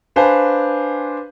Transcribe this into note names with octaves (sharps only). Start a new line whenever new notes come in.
D4 B4 C5 F5 G#5